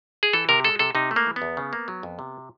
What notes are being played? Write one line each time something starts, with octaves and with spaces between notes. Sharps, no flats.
G#4
E3 A4
C3 A#4
G#3 A4
C3 A4
C3 D#4
A3
A#3
E3
B3
E2
C#3
A#3
F#3
F2
C3